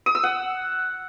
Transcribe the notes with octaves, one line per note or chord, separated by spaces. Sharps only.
D#6
E6
F#5